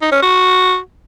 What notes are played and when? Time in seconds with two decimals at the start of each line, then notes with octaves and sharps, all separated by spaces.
0.02 D#4
0.12 C#4
0.22 F#4